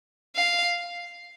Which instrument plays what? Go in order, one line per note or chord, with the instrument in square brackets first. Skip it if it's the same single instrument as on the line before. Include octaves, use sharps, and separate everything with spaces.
[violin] F5